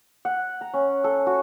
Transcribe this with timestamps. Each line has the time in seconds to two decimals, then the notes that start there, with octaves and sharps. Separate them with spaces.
0.25 F#5
0.61 A#5
0.74 C#4
1.04 A4
1.27 F#4